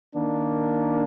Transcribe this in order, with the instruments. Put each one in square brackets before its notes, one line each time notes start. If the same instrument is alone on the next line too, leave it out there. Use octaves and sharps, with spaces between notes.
[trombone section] D#3 A#3 D4